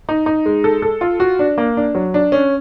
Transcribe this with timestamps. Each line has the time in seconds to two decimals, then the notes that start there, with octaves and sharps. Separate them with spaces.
0.09 D#4
0.26 D#4
0.46 G#3
0.64 A4
0.82 A4
1.01 F4
1.20 F#4
1.39 D4
1.58 A#3
1.77 D4
1.95 F#3
2.14 D4
2.32 C#4